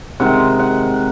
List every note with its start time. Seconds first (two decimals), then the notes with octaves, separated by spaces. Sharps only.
0.20 C3 D#3 G#3 F#5
0.59 F#5